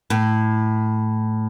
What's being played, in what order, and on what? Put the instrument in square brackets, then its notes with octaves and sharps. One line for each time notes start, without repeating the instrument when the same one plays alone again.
[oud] A2